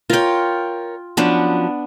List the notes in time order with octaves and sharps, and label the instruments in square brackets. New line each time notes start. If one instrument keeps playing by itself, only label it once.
[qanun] F4 G5 [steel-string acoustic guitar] A#4 C#5
[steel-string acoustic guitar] F3 F#3 C#4 [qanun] B3 D4